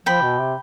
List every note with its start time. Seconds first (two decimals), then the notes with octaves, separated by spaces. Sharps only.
0.06 F3 G5 B5
0.22 B2
0.39 C3